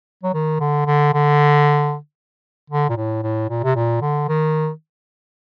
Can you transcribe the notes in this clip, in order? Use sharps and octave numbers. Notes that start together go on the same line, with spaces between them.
F#3
D#3
D3
D3
D3
D3
A#2
A2
A2
A#2
C3
A#2
D3
D#3